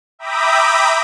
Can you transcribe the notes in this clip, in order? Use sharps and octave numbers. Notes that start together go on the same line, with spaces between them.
E5 G5 A#5 B5 D6 D#6